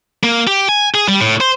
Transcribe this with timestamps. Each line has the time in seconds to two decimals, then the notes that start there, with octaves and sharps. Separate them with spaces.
0.23 A#3
0.47 G4
0.69 G#5
0.95 G#4
1.09 G3
1.21 A2
1.41 C5